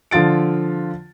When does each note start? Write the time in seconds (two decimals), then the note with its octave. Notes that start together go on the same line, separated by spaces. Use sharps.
0.11 D3 F3 F4 A6 D7